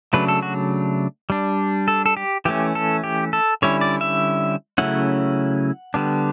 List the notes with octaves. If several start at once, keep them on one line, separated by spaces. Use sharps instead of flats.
C#3 F#3 A3 D4 B4
A4
F#4
G3 D4
A4
A4
G4
E3 A3 C#4 G4
A4
G4
A4
D3 G3 C#4 E4 C#5
D5
E5
C#3 F#3 A3 C#4 E4 F#5
D3 G3 B3 D4